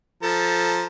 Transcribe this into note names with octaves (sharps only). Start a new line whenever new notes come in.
F3 A4 A#5